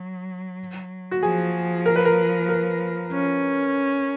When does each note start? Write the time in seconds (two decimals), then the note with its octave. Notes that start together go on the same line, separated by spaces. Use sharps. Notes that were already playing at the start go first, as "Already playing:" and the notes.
Already playing: F#3
1.11 F#4
1.23 F3 G#4
1.86 A#4
1.96 B4
2.05 A#4
2.49 A#4
3.12 C#4